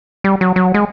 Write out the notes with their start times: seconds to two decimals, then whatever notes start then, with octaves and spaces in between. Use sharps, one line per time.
0.24 G3
0.41 F#3
0.56 F#3
0.74 G#3